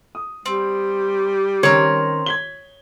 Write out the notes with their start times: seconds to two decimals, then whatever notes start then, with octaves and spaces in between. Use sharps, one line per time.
0.15 D#6
0.46 G3 C4
1.63 D#3 C4 C#4 A#4 C#5
2.26 G#6 B6 G7